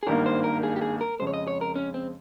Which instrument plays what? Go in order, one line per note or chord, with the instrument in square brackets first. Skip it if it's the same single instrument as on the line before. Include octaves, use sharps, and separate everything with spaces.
[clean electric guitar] G#4
[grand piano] G#1 G2 D#3 A#3 [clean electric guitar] A#4
[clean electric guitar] C5
A#4
G#4
G4
G#4
A#4
[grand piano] F2 C#3 G#3 [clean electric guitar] C5
[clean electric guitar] C#5
D#5
C#5
A#4
C#4
C4